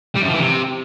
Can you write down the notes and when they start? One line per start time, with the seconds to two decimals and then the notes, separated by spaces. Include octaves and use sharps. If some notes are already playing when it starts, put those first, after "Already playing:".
0.16 G3
0.22 F#2
0.28 F3
0.34 E3
0.40 C3